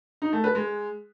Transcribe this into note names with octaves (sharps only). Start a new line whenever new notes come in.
D#4
A3
B4
G#3